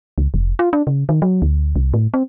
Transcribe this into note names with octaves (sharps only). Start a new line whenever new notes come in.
C#2
F1
F4
D4
C#3
D#3
F#3
D2
C2
A2
C4